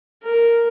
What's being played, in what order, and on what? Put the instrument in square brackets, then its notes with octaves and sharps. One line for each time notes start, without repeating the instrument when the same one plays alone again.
[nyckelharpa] A#4